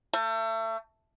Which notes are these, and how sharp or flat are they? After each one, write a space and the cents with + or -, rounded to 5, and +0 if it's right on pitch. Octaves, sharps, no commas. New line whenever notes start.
A3 +30